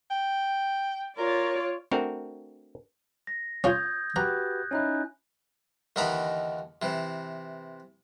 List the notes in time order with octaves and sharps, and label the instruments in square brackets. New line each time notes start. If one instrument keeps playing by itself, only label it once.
[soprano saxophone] G5
[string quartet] F4 C#5 D5 [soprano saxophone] A#4
[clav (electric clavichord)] A3 C4 D4 F#4 A#4
[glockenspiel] A#6
[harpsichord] C#4 F4 [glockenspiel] D#6 G6 G#6
[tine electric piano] F#4 G4 B4 [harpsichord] A#5 [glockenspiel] F#6
[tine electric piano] C#4 D#4 E4 [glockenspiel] G#5 F#6
[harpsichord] D#2 D3 E3 D#4 A#5 B5
C3 E3